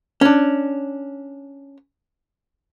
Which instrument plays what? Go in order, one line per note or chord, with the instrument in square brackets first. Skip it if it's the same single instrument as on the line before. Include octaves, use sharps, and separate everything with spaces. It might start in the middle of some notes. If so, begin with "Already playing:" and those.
[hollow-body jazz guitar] C#4 D4